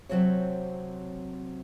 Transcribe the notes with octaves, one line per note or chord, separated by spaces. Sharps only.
C3 D#3 F#3 C4 A4 C#5